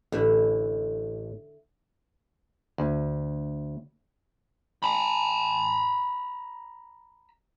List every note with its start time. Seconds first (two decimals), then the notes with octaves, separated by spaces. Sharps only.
0.12 A1 D3 E4
2.78 D2
4.83 A#5 B5